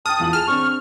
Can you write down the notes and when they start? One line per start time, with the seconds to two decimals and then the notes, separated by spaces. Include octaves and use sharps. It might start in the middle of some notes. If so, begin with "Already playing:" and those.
0.06 G5 A5 D#6 F6
0.20 E2 F4 F#7
0.33 G#4 F6 E7
0.48 C4 D4 C#6